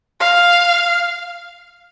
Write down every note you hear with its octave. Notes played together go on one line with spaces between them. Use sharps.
F5